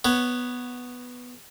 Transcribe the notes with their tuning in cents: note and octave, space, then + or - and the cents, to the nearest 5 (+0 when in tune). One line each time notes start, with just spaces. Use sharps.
B3 +0 C#5 +0